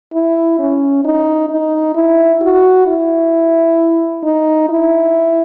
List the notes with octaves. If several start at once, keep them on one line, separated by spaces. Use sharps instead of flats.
E4
C#4
D#4
D#4
E4
F#4
E4
D#4
E4